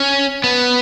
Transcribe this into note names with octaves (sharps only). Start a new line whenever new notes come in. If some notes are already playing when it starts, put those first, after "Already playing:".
Already playing: C#4
B3